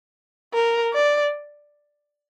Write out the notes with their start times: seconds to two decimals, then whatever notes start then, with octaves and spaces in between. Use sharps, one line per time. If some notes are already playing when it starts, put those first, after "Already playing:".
0.54 A#4
0.93 D5